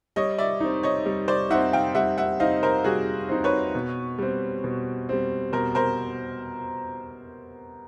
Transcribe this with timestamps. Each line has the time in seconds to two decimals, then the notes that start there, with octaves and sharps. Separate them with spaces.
0.16 G3 C#5 D#5
0.38 D5 E5
0.60 C4 D#4
0.83 C#5 D#5
1.06 G3
1.28 C5 D5
1.50 C4 D#4 E5 F#5
1.73 F5 G5
1.95 G3 E5 F#5
2.18 E5 F#5
2.40 C4 D#4 D#5 F5
2.63 A#4 C5
2.84 G3 F#4 G#4
3.29 C4 D#4
3.44 B4 C#5
3.75 B2
4.18 G3 C4
4.64 B2
5.09 G3 C4
5.53 B2 A#4 C5
5.75 A#4 C5